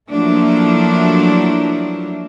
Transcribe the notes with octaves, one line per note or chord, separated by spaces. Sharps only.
F3 F#3 A3 A#3 D4 E4